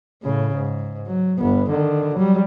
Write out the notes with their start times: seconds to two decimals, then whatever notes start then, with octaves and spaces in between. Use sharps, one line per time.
0.23 A2 C#3
0.55 G#2
1.07 F#3
1.40 G1 B3
1.70 D3 D#3
2.15 F#3 G3